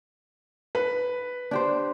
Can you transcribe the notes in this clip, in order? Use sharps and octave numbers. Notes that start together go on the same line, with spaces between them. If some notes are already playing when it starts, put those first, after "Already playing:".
B4
D4 G4 C5